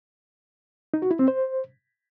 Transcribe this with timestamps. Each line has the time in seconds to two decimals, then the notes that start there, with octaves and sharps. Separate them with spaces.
0.94 D#4
1.02 F#4
1.11 E4
1.19 C4
1.28 C5